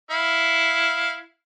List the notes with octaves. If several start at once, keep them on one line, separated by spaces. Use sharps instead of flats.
E4 F5